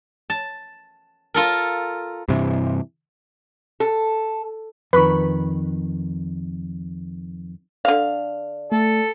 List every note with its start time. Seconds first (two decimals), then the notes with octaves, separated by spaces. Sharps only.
0.30 A5
1.34 F4 A4 A#4
2.28 G2 C3 E3
3.80 A4
4.93 F2 D#3 B4 B5 C#6
7.85 D3 F5
8.72 A3 A4